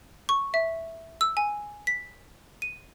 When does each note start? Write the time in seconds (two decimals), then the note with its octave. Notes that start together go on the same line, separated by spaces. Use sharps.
0.29 C#6
0.54 E5
1.21 E6
1.37 G#5
1.87 B6
2.62 D#7